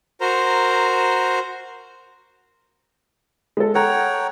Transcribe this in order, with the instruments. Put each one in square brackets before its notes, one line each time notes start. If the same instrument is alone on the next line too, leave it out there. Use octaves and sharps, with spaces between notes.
[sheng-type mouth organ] F#4 A#4 C5 A#5
[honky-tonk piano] G#3 A4
[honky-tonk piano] A4 A#5 [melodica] C#5 F#5 G5